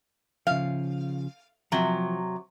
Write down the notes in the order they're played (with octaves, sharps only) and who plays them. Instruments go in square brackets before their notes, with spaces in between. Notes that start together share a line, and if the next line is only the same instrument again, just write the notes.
[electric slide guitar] C#3 F3 [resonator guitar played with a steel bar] F5
[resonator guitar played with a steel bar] C3 F#3 [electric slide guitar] F3